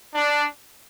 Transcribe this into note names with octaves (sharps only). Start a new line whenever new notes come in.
D4